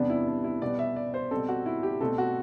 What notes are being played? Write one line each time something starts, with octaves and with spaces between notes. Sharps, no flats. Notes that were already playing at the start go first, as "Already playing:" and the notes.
Already playing: E2 C3 G3 B3 D4
E4
D4
E4
B2 G3 B3 D5
E5
D5
C5
B2 G3 C4 A4
F#4
E4
G4
B2 A3 C4 A4
F#4